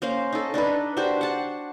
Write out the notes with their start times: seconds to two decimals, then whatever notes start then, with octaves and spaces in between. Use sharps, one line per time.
0.02 A#3 C#4 C5 F5
0.32 D#4 A4
0.54 D4 D#4 A4 B4
0.97 D4 F#4 G4 C5
1.21 F#5 A5